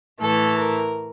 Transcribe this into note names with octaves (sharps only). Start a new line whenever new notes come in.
A2 E3 A3 A4
A#4